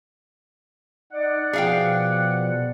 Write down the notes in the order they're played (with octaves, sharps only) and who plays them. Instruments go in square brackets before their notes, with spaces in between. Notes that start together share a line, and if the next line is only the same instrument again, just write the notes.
[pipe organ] D#4 [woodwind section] D5 F#5
[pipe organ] B2 F3 [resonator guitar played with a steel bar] G#4 F5 G5